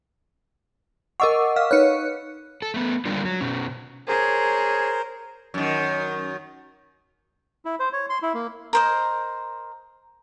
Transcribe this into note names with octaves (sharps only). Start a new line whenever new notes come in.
A#4 D#5 F#5 C#6 D6 E6
F5 F6
D#4 B4 C#5 F#6 C#7
A4
A3 B3
D3 G3 G#3 A#3 D4 F4
F#3
B2 C#4
G#4 A#4 C5 C#5
F#2 D#3
E4
C5
C#5
C6
E4
A#3
A#4 C5 D#5